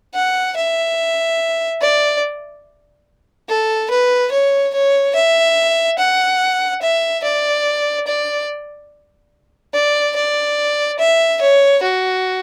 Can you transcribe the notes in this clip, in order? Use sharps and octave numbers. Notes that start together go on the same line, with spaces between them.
F#5
E5
D5
A4
B4
C#5
C#5
E5
F#5
E5
D5
D5
D5
D5
E5
C#5
F#4